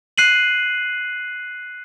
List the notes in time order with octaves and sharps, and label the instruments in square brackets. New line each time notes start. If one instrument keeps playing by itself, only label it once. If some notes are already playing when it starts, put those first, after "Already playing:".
[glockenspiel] F#6 C7 D#7 F#7